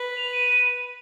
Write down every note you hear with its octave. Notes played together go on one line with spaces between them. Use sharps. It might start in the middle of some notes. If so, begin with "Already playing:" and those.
Already playing: B4
F7
D#7